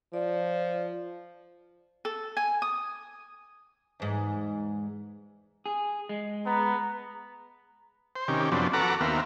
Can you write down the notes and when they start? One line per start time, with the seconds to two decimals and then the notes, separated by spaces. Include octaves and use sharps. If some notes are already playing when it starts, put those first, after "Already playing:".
0.13 F3 D5
2.05 A4
2.37 G#5
2.62 D#6
4.00 E2 G#2
5.66 G#4
6.09 G#3
6.46 B3 A#5
8.16 C5
8.28 C3 D#3 C#4 G4
8.52 F#2 F3 B3 C4 D4
8.73 F#4 A4 B4 F#5 A#5 D6
9.01 D#2 B3 C4 A#4 E5 F5